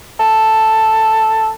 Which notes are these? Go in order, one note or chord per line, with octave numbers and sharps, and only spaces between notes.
A4